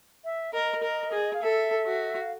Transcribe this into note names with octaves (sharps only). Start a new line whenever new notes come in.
E5
A#4 D#5
A#4
G#4
F5
A4 E5
F#4
F5